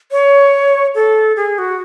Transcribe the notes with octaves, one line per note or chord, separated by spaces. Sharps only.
C#5
A4
G#4
F#4